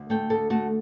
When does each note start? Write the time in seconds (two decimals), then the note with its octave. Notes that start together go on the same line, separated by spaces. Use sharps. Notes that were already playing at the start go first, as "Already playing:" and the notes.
Already playing: D2
0.10 A3 G5
0.30 D2 A4
0.50 A3 F#4